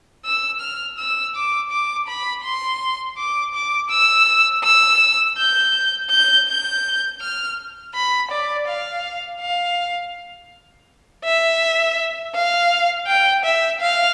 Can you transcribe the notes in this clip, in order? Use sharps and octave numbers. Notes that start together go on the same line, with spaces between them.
E6
F6
E6
D6
D6
B5
C6
D6
D6
E6
E6
G6
G6
G6
F6
B5
D5
F5
F5
E5
F5
G5
E5
F5